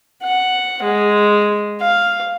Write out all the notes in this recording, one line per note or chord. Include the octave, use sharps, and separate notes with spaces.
F#5
G#3
F5